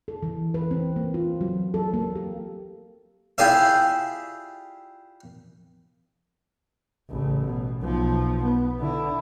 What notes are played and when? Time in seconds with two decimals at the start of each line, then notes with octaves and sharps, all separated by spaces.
0.08 A4
0.23 E3
0.54 B4
0.71 C4
0.96 A#3
1.14 F4
1.41 F#3
1.74 A4
1.94 A#3
2.16 G4
3.38 E4 F4 G4 G#4 D5 E5
7.10 A1 C#3
7.45 B2
7.81 B1 F3
8.44 B3
8.80 D3 E4